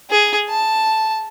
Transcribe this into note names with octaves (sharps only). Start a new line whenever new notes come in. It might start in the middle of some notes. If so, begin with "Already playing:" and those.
G#4
A5